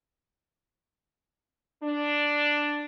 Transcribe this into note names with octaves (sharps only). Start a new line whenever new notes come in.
D4